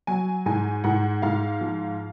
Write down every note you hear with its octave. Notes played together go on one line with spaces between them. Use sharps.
F#3 G#5
G#2 G#5
G#2 F#5
G#2 F5
F3